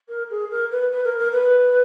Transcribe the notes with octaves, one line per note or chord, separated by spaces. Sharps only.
A#4
G#4
A#4
B4
B4
A#4
A#4
B4